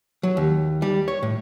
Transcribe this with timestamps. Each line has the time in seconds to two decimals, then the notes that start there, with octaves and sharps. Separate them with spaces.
0.23 F#3
0.37 D#2
0.82 G3
1.08 C#5
1.23 A2